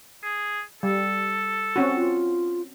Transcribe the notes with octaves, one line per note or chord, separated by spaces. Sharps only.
G#4
G3 A4
C4 C#4 F#4
F4